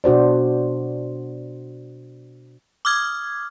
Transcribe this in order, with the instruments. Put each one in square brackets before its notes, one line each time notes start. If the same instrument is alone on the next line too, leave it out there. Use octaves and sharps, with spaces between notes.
[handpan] B2 D4 F#4 C5 D5
[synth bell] D6 D#6 F6 G#6